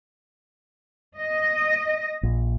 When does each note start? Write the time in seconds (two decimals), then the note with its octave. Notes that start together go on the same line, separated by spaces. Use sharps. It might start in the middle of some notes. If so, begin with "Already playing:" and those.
1.19 D#5
2.23 A#1